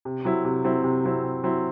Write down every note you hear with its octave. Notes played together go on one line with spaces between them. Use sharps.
C3
F#3 C4 E4
C3
F#3 C4 E4
C3
F#3 C4 E4
C3
F#3 C4 E4